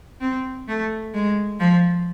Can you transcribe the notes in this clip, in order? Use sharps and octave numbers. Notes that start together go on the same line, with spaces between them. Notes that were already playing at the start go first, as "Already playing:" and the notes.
C4
A3
G#3
F3